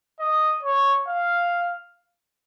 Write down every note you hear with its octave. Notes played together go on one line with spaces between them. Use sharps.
D#5
C#5
F5